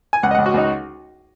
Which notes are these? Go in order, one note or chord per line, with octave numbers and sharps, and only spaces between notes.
G#5
C#2 F#5
D#5
C#2 F#5
F#4
C#2 D#4